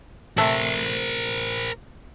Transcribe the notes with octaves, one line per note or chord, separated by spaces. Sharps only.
C3 A3 A#4 C5